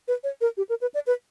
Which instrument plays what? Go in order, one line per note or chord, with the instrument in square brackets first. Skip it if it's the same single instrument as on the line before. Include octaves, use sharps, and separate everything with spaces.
[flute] B4
C#5
A#4
G4
A#4
B4
D5
B4